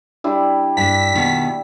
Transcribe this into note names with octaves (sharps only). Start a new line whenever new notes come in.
G3 D4 E4
G2 D4 A5 B6
B2 D#3